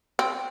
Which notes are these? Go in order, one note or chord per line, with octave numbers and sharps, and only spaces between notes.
C4